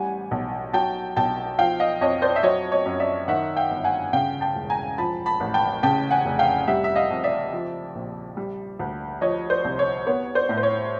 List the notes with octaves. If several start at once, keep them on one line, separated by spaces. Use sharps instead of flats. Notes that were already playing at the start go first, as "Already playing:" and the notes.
Already playing: A1 G3 F#5 G#5
B1
F#3 G5 A5
B1 G5 A5
F3 F5 G5
D#5 F5
F2 C#5 D#5
C5 D5
E5
F#3 C#5 D#5
C#5 D#5
F#2
D5 E5
D#3 E5 F#5
F5 G5
G1
F#5 G#5
C#3 F5 G5
G5 A5
E1
G#5 A#5
F3 A5 B5
A5 B5
A1
G5 A5
C#3 G5 A5
F#5 G#5
F1
F5 G5
G3 E5 F#5
E5
D#5 F5
F2
D5 E5
F3
A#1
G3
D2
F3 C#5 D#5
C5 D5
C2
C#5
B3 C#5
C5 D5
A2
C5
C#5